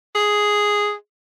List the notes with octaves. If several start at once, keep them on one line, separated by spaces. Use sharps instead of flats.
G#4